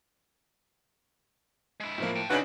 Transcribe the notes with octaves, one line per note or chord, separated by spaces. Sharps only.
G#3 E4
A2 F3 A#3
G5 A5
F#2 C#3 C4 D4 D#4 F#4 B4 F#7